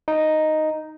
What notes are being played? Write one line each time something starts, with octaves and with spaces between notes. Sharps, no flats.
D#4